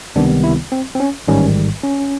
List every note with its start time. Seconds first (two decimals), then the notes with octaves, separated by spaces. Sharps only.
0.16 C#2 C3 D#3 G3 B3 D4
0.44 E4
0.72 C4
0.95 C4
1.00 C#4
1.28 A1 G#2 D#3 G3 C#4
1.84 C#4